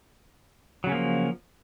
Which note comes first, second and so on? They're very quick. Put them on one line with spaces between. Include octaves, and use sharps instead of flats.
F#3 C#3 C#4 A#3 F3